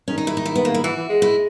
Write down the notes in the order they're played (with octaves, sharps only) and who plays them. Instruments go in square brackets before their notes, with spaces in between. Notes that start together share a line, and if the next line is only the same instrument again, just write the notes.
[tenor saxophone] D#3 [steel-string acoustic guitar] C#4
[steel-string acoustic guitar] D#4
E4
D#4
E4
B3
A#3
E4
[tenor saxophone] E3 [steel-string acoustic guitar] F#4
[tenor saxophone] E3
G#3
[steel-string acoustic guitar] E4